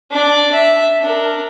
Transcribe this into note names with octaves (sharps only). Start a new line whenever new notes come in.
D4 D5
E5
D4 A#4